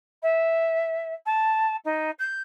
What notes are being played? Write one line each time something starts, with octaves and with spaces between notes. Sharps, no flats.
E5
A5
D#4
G6